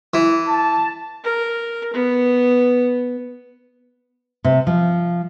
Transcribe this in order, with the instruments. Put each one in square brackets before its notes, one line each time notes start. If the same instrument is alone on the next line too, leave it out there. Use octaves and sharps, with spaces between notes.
[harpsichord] E3
[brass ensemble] A5
[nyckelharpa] A#4
B3
[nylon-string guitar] C3
F3